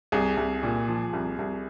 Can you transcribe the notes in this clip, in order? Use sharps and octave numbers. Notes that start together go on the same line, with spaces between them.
C2 G#4
C2
A#2
F3
C2
C2